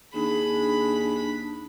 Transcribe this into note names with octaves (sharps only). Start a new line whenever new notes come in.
D#2 D4 G#4 B5